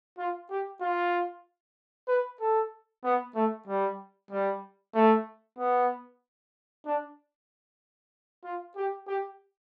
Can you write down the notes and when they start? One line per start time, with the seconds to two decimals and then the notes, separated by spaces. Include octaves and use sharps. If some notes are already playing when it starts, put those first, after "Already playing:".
0.18 F4
0.50 G4
0.81 F4
2.08 B4
2.40 A4
3.04 B3
3.35 A3
3.68 G3
4.31 G3
4.94 A3
5.58 B3
6.86 D4
8.44 F4
8.76 G4
9.07 G4